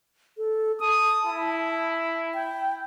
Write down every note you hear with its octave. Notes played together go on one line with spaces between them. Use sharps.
A4
A5 D#6
E4
G5